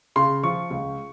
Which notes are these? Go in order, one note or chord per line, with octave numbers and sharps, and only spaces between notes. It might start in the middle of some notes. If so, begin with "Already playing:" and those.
C#3 C6
F3 C#6
C#2